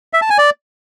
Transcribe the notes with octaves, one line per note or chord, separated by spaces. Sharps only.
E5
A5
G#5
D5